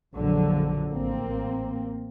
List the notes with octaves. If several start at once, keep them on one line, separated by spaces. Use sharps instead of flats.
A#1 F2 D3 F3 F#3
A1 A#3 C4